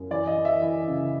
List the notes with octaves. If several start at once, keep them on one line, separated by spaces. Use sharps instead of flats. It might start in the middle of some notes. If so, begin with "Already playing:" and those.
Already playing: F#2
E3 D5
D#5
E3
E5
E3
C#3